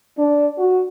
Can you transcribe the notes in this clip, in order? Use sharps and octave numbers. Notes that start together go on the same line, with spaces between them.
D4
F#4